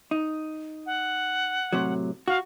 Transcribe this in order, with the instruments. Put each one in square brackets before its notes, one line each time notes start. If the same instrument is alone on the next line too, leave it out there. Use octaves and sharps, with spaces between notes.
[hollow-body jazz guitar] D#4
[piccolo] F#5
[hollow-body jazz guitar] A2 C3 F#3
[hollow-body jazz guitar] F#4 [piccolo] F5